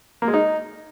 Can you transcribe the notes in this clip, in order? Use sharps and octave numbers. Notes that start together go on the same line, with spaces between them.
A#3
G#3
D#4